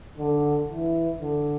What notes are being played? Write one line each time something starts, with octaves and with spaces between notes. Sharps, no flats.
D3
E3
D3